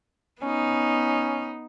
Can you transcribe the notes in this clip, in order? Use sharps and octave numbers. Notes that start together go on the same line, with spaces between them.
B3 C#4 D#4